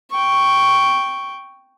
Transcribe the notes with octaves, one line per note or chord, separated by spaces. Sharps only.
G5 C#6